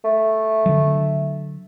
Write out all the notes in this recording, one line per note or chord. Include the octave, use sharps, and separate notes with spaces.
A3
D3 F#3